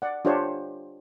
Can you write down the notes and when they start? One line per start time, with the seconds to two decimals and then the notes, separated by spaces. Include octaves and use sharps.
0.02 D5 F#5
0.25 D4 F4 G4 C5 C#5